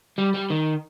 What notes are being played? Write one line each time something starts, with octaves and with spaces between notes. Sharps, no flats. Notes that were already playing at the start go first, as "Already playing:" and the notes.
G3
G3
D#3